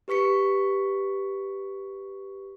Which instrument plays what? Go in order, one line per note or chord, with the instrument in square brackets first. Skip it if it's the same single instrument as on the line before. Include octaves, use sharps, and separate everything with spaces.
[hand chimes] G4 B4 C#6 B6 C#7